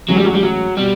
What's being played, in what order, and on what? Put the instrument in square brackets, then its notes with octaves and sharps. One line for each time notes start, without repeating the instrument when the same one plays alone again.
[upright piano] A2 E3 G#3 C#4 [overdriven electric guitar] F#3
[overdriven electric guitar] G3
F#3
G3
F#3
[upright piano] B2 [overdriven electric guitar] G3